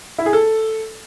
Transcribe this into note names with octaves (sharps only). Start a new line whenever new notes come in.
E4
G#4
A4